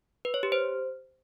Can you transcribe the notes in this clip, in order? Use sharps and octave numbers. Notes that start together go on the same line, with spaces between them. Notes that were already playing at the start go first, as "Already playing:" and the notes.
B4
C#5
G4
C5